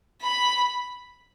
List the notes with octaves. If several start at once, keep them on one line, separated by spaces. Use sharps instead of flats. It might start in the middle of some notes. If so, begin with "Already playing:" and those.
B5